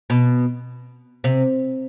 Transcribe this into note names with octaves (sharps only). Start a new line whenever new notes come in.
B2
C3